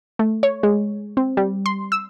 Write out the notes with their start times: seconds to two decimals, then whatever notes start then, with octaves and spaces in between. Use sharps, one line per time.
0.19 A3
0.43 C#5
0.63 G#3
1.17 C4
1.37 G3
1.66 C6
1.92 E6